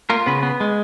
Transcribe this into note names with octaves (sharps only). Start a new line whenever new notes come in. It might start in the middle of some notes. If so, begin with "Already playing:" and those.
A#3 F4 A#4
C#3 B3 B4
B3
G#3